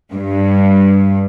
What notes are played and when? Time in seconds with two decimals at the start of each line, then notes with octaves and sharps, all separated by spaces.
0.12 G2